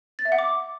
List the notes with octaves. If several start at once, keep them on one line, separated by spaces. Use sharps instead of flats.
A6
E5
F#5
D6